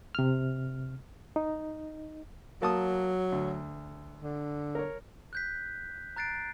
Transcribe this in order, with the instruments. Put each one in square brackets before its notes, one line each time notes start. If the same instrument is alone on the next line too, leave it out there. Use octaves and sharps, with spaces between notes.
[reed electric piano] C3 F6
D#4
[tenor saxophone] F#3 [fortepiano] A#3 A5 D#6
[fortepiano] D2
[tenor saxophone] D3
[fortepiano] A#4 C#5
[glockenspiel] F#6 G6 B6
A#5 F#6 A6 C7 D7